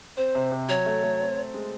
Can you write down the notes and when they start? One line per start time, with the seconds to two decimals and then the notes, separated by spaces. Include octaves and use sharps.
0.17 C4 C5
0.35 C3
0.52 C3
0.69 F#3 C#5
0.86 A3
1.03 A3
1.20 C4
1.37 C4
1.54 G#3